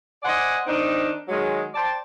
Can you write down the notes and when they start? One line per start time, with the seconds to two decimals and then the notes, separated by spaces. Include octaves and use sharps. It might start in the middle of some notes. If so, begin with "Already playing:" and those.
0.23 C5 D5 D#5 F#5 G#5
0.66 D#3 C4 D4 D#4
1.28 D#3 F#3 G#3
1.74 C5 D5 G5 A5